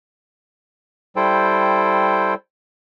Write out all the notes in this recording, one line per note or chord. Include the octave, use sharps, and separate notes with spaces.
G3 E4 A4 C5 G5